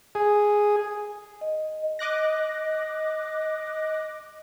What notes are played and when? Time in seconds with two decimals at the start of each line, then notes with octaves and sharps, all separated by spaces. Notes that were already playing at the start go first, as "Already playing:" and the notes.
0.15 G#4
1.41 D#5
1.99 D#5 D6 F#6 A#6